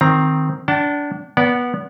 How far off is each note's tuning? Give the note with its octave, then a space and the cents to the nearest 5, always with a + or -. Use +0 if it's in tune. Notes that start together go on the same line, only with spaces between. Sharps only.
D#3 +0 C4 +0 A#5 +20
D4 -20 F#5 +40 A5 +15
B3 -15 D5 -30 F#5 +0